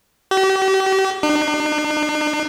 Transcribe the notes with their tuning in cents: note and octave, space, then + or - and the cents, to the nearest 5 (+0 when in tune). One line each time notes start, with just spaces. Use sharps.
G4 -40
D4 +45